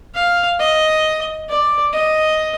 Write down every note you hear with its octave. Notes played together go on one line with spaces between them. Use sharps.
F5
D#5
D5
D#5